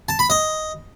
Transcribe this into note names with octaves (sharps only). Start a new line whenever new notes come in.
A5
B5
D#5